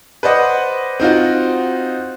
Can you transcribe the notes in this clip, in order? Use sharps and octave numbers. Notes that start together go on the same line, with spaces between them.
B4 C5 D5 D#5 F#5
C4 D#4 F4 F#4